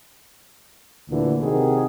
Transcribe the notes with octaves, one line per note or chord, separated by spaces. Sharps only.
D2 A#2 D3 E3
C3 D#3 F#4 G#4